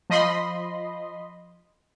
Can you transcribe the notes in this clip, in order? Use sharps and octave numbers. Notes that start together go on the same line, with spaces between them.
F3 D#5 B5 C6